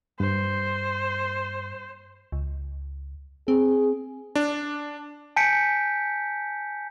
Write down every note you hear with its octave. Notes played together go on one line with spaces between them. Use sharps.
G2 C5
C#2
C4 G#4
D4
G#5 A5 G6 B6 C#7 D7